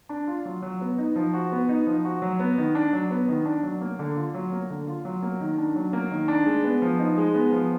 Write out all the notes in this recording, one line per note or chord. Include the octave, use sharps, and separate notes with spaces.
D4
F4
F#3
F#3
B3
D#4
F3
F#4
B3
D#4
F3
F#4
F#3
B3
D#3
D4
F#3
B3
D#3
D4
F#3
A#3
D3
F4
F#3
A#3
D3
F4
F#3
A#3
D#3
D4
F#3
A#3
D#3
D4
G#3
B3
F3
D#4
G#3
B3
F3